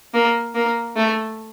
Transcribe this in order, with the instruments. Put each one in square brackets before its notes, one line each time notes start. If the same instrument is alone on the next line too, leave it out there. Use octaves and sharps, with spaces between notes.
[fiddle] A#3
A#3
A3